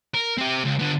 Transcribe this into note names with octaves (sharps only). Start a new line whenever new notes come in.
A#4
C4 G4
C#2
D3 B3